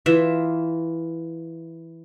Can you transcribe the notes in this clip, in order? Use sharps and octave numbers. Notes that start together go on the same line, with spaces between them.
E3 F4 E5